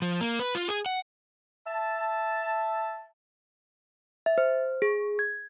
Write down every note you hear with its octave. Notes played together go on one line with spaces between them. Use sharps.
F3
A#3
B4
F4
G#4
F#5
E5 A5
E5
C5
G#4
G#6